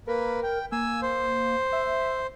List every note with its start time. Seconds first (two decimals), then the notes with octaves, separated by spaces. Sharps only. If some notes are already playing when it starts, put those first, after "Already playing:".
0.07 A#3 A#4 B4
0.43 G5
0.72 A#3 G#5 E6
1.02 C5
1.72 E5